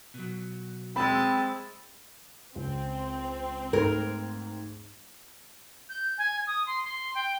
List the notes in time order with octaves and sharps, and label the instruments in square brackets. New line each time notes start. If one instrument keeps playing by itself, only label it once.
[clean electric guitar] B2 F#3
[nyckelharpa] G#3 A5 [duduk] C4 [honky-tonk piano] B5 E6
[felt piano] C#2 [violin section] C4
[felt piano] G#2 A3 G#6 [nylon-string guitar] A#4
[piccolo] G6
G#5
D#6
C6
C6
G5